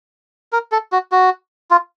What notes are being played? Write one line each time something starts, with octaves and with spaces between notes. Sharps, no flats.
A#4
A4
F#4
F#4
F4